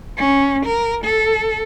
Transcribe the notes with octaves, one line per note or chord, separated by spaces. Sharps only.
C#4
A#4
A4